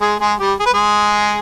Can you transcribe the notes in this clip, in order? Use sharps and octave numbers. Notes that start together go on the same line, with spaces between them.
G#3 G#4
G#3 G#4
G3 G4
G#4
B4
G#3 G#4